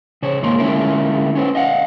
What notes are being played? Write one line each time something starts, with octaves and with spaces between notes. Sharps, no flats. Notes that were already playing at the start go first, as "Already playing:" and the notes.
C#3 C5 C#5
G#2 D#3 A#3 C6
D3 G#3 C#4 E4 F4 A#4
C#4 B4 C5
D#5 F5 F#5